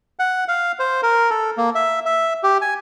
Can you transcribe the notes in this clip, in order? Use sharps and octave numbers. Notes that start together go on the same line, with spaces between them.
F#5
F5
C5
A#4
A4
A#3
E5
E5
G4
G#5